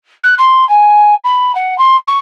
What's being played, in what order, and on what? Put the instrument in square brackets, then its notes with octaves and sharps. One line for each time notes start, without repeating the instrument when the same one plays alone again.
[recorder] F#6
C6
G#5
B5
F#5
C6
C#6